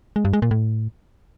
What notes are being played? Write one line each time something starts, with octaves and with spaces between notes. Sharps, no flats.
G#3
G2
G#3
A#2
A2